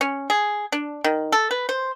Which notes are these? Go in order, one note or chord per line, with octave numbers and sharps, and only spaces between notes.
C#4
G#4
D4
D#3
A4
B4
C5